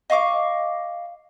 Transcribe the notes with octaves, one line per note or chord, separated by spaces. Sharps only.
D#5 F5 C#6 D6